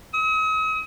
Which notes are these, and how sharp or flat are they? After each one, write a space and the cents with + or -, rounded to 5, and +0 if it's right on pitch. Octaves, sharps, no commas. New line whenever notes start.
D#6 +45